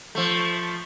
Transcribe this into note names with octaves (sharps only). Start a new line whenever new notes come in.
F3 A3